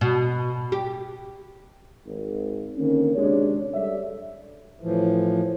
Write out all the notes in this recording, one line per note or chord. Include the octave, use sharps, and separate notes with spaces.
B2
G4
G#1
D3 D#3 A#3 C4 C#4
C3 G#3 D4 F#4 C#5
G3 G4 A4 D5 E5
A2 E3 F3